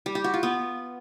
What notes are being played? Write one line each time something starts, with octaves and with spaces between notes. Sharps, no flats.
G3
G4
F#4
F4
B3